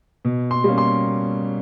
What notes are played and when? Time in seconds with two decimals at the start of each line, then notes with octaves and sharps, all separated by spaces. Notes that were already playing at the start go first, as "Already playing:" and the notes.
0.25 B2
0.51 C6
0.64 G3 A#3 C#4
0.78 C6